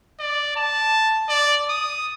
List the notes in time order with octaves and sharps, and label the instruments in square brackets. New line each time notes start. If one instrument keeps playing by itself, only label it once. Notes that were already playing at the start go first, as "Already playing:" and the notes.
[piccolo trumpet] D5
A5
D5
D#6